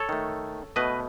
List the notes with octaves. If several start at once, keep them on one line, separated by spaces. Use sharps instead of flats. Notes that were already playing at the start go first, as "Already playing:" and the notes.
Already playing: A4 C#5
D#3 A3
B2 A3 B4 D#5